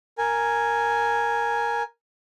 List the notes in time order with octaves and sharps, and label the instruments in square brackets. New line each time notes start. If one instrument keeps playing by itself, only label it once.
[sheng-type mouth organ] A#4 G#5